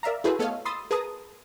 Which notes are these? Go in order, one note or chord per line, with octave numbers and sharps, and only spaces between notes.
A#4 D5 E5 F5 A#5
E4 F#4 G#4 A4 B4 C5
A3 B3 A4 C#5 D#5 F5
B5 C6 D#6 E6 A6
G#4 A#4 B4 A5 A#5 D#6